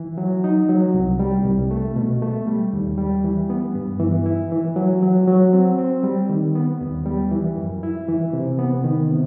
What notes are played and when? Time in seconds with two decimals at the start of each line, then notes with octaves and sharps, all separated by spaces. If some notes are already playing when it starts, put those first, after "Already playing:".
Already playing: E3
0.18 F#3
0.44 D#4
0.69 F#3
0.94 C2
1.19 G3
1.45 C2
1.71 A3
1.96 B2
2.22 A3
2.47 G3
2.73 D#2
2.98 G3
3.24 E3
3.50 B3
3.75 G2
4.00 E3
4.26 E4
4.52 E3
4.76 F#3
5.02 F#3
5.27 F#3
5.53 C4
5.78 C4
6.03 G3
6.30 D#3
6.55 B3
6.81 D#2
7.06 G3
7.31 E3
7.58 F#2
7.83 E4
8.08 E3
8.33 C3
8.59 B3
8.84 D#3
9.10 C3